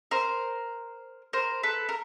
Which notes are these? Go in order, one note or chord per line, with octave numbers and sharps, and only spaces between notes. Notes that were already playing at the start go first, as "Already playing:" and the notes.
A#4 C5
A#4 C5
A4 B4
A#4